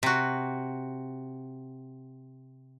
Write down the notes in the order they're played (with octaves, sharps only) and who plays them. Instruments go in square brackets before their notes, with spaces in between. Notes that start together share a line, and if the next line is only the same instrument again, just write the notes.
[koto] C3 F#4